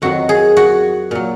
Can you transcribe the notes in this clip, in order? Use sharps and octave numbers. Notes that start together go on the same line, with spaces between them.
F2 D#3 F#3 F#4
G#4
F#4
A#2 F#3